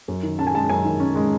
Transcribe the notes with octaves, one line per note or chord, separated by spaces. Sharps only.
F#2
D#3
C#4 A5
G#5
G#3 A5
F#2 G#5
D#3
C#4
G#3